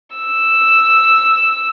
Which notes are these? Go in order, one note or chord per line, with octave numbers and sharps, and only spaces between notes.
E6